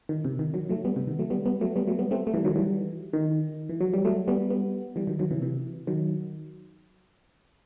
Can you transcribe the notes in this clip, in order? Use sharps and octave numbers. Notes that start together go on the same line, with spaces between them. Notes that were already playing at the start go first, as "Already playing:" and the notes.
D#3
C3
D#3
D#3 F#3
F#3 A3
G3 B3
C3
D#3
F#3 A3
G3 B3
G3 B3
F#3 A3
G3 B3
F#3 A3
G3 B3
A3 C4
A3
E3 G3
D#3 F#3
E3 G3
D#3
E3
F#3
G3
F#3 A3
G3 B3
G3 B3
E3 G3
D#3 F#3
D#3 F#3
C3 E3
C3 E3
D#3 F#3